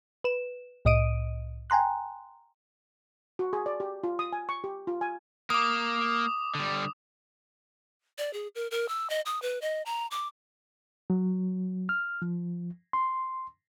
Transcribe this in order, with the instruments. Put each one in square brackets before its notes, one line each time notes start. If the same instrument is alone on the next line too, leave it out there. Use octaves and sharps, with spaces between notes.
[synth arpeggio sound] B4 E7
C2 A2 D#5 D#6 D7 D#7
G5 G#5 A#5 C6 F#6
[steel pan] F#4
G#4
D5
G4
F4
D#6
G#5
C#6
G4
F4
G#5
[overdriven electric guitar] A#3 [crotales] D6 D#6
[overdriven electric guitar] D3 G3
[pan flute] D5
G#4
A#4
A#4
E6
D#5
D#6
B4
D#5
A#5
D6
[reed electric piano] F#3
F6
F3
C6